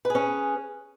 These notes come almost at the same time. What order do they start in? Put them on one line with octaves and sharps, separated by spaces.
B4 G#4 C#4